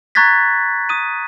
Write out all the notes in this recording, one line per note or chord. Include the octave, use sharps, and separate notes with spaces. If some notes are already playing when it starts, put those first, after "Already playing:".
A#5 C#6 F#6 G#6 A6 B6
D#6 D#7